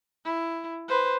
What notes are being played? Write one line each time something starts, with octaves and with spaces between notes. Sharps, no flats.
E4
B4 C5